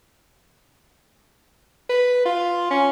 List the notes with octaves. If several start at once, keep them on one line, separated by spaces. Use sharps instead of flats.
B4
F4
C#4